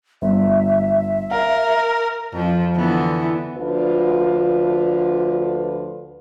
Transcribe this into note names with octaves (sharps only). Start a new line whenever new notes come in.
G1 E5
A#4 F5
F2 F3
D3 E3 B3
D2 D3 F3 F4 B4